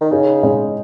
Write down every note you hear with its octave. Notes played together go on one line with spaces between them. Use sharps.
D#3
C#3 D#4 G#4
G#3 C#4